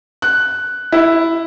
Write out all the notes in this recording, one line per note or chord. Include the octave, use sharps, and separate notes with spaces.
F#6
E4